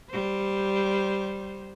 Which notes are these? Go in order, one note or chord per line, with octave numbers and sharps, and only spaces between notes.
G3 C5